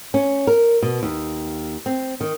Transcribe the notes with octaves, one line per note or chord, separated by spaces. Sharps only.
C#4
A#4
B2
D#2
C4
D#3